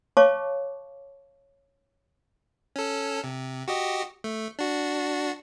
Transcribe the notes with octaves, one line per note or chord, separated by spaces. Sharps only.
C#5 F5 A5 C#6 D6
C#4 A4
C3
F#4 G4 D#5
A3
D4 F#4